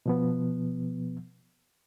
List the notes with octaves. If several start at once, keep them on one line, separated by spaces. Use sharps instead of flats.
B2 F3 B3